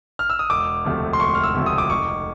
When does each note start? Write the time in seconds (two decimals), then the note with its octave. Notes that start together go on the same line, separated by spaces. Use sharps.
0.19 F6
0.30 E6
0.39 D#6
0.50 E1 D6
0.85 D2 C3 F3 A3
1.13 C6
1.20 E1 C#6
1.35 F6
1.44 E6
1.55 D2 C3 F3 A3
1.66 D#6
1.78 D6
1.90 F1 C#6